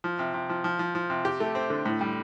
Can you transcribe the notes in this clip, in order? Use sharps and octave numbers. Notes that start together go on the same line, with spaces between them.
F3
C3
C3
F3
F3
F3
F3
C3
G4
A3
C4
D3
A2
G3